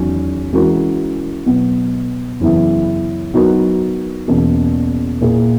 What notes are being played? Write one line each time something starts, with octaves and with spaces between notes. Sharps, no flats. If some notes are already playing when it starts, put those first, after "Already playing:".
Already playing: E2 D#3 F#3 C#4 F#4
E3 G#3 C#4 F#4 A#4
B2 F#3 B3
F#2 C#3 E3 B3 E4
F#3 B3 D#4 F#4 A#4
E2 B2 A#3 C#4
A#2 A#3 E4 G#4